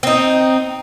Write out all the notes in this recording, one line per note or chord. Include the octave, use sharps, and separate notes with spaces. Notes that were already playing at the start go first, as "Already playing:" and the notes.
C4 D#4